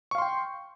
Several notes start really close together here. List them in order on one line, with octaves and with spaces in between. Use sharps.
C#6 F5 C6 G5